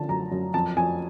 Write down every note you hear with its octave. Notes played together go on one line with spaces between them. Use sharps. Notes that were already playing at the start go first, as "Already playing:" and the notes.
Already playing: D3 F3 A5
F#2 A#5
F#2
F2 A5
F2 G#5